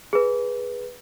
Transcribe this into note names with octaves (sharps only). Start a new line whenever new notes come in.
G#4 B4